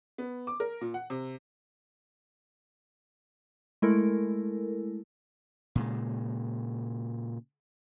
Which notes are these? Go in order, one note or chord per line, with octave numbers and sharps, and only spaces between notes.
B3
D6
A#4
A#2
F#5
C3
G#3 A3 E4 A4 A#4
A#2 C#3 G#3